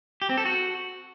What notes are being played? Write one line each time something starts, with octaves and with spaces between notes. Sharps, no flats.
G4
C4
A4
F#4